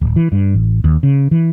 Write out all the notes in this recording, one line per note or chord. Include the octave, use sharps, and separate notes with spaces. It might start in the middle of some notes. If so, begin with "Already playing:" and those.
D1
E3
G2
A1
D#2
C#3
E3